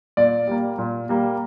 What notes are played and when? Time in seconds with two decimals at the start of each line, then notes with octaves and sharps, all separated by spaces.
0.17 A#2 D5
0.47 G3 A#3
0.78 A#2
1.09 G3 A#3